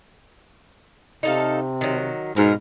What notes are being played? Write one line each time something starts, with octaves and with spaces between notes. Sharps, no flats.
C3 D#4 A4 F5
D#3 F#3
G#2 B2 A#4